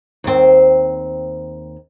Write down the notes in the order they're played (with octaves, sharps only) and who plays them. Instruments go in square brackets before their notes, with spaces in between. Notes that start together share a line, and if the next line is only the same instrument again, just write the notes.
[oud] D#2 C4